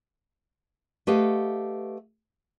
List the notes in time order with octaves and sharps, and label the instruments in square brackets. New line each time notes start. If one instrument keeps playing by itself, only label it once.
[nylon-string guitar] A3 G4 B4 D#5 F5 F#5